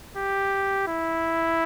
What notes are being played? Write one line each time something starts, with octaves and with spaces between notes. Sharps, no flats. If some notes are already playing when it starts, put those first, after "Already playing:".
G4
E4